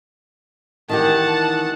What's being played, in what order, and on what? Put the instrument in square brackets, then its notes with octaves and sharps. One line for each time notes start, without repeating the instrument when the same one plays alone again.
[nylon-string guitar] D#3 E3 G4 [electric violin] F#5 A5